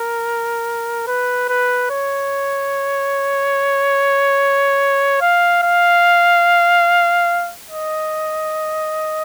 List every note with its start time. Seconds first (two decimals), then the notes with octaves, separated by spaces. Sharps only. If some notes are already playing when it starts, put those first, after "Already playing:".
Already playing: A#4
1.07 B4
1.49 B4
1.90 C#5
5.21 F5
5.63 F5
7.70 D#5